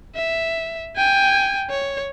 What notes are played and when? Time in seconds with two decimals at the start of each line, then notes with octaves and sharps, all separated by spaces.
0.16 E5
0.96 G5 G#5
1.70 C#5